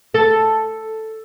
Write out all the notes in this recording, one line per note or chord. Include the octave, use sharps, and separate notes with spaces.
A4